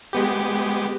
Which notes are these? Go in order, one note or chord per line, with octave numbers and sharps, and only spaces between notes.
G#3 B3 G4